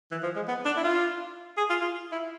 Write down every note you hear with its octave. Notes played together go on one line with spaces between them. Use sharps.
E3
F3
G#3
B3
D4
E4
F4
G#4
F4
F4
E4